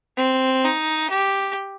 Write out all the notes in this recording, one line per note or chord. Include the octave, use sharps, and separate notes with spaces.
C4
D#4
G4